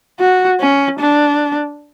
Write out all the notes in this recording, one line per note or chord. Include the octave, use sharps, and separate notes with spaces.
F#4
C#4
D4